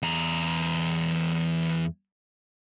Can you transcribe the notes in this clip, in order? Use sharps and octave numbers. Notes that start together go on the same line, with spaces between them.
E2 A#5